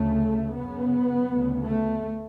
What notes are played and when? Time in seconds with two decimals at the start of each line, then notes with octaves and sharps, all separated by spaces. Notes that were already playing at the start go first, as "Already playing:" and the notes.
Already playing: D2 C#3 A3
0.55 F#2 C#3 B3
1.29 D2 C#3
1.66 A3